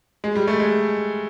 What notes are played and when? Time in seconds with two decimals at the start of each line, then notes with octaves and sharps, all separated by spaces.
0.24 G#3
0.35 G3
0.48 A3
0.60 G#3